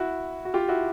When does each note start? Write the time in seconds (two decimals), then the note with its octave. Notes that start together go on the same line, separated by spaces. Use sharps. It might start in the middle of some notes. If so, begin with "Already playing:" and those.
Already playing: E4 F#4
0.45 F#4
0.54 F4 G4
0.69 E4 F#4